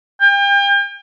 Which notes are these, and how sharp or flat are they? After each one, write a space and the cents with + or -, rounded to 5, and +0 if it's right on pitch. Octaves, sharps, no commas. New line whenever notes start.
G5 +40